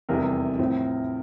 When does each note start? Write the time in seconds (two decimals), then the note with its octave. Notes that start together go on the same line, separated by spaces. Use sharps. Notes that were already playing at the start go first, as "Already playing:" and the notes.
0.09 F1 E2 C3 E3 G3 A#4
0.59 A2 F3 C4 E4